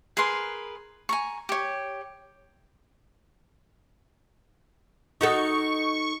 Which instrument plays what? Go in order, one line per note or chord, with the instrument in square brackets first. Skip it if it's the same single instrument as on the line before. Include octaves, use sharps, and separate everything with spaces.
[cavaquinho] G#4 A#4 B4 C6
G#5 A#5 C#6
G4 C#5
[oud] D#4 F#4 A4 [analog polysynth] C#6